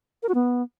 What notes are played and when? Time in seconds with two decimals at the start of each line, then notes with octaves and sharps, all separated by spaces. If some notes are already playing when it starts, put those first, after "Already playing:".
0.23 A#4
0.29 F#4
0.35 B3